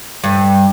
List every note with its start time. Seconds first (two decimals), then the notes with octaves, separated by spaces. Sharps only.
0.24 G2